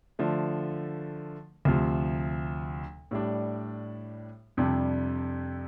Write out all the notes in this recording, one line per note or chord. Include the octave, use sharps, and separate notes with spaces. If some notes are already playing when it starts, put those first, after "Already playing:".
D3 F3 A3
D2 C3 F3
A2 G3 D4
F2 C3 G3 D4